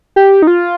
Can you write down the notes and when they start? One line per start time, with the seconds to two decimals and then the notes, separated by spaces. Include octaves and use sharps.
0.16 G4
0.42 D#4
0.47 F4